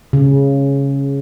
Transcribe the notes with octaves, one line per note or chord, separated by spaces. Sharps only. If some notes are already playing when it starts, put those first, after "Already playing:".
C#3